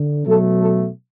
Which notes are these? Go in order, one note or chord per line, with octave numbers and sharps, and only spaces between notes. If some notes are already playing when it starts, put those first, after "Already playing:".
Already playing: D3
B2 F#3 A3 A4
A4